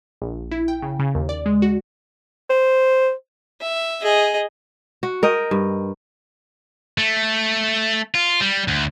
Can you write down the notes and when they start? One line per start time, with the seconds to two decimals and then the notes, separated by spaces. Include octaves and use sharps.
0.22 A#1
0.52 E4
0.68 G5
0.83 C#3
0.99 C#3
1.15 D#2
1.29 D5
1.46 G#3
1.62 F#4
2.50 C5
3.61 E5
4.02 G#4 D#5
5.03 F#4
5.23 A#4 D#5 G5
5.51 G2
6.98 A3
8.15 F4
8.41 G3
8.68 D2